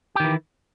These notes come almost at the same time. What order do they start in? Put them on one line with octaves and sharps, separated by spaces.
G4 D#3 E3